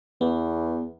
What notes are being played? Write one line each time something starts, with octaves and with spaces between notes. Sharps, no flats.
E2 B3